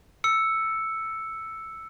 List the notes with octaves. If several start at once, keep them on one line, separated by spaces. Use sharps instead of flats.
E6 C#7